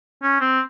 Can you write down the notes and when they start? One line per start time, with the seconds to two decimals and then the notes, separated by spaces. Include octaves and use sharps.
0.23 C#4
0.41 C4